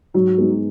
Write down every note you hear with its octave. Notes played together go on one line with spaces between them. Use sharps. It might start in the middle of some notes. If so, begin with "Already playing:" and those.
G#2 F#3
G#3 B3 D#4